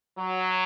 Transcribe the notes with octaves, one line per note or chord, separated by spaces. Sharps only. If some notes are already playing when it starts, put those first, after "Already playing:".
F#3